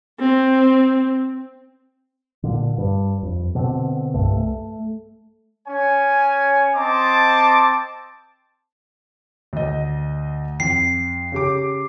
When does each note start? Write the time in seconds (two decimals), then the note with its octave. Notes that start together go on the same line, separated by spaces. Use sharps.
0.20 C4
2.43 A#2 D3
2.78 G2
3.23 F2
3.55 B2 D3 F#3 C4
4.14 C2 G2 A3
4.37 A3
5.68 C#4 C#5 G#5
6.76 C4 D#5 A5 C6 D6
9.53 D2 D#5
10.60 F2 C7
11.32 C#3 G4 D6